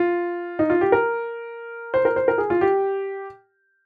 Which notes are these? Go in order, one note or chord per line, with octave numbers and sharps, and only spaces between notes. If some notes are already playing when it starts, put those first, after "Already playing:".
Already playing: F4
D#4
F4
G4
A#4
C5
A#4
C5
A#4
G#4
F4
G4